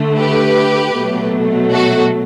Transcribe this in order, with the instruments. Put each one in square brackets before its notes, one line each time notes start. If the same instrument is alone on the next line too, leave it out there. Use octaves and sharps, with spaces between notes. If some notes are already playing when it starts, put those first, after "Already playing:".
Already playing: [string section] D3 A3
G4 B4
B2 F#3 A3
F#4 A4